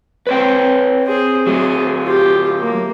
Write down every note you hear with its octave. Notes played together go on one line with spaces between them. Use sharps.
C4 B4 C#5 G5
C4 G#4
F#3 A3 G#4
F4 G4
A#3